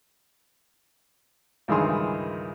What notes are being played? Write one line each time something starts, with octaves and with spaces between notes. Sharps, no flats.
C#2 G2 D#3 E3 G#4 C6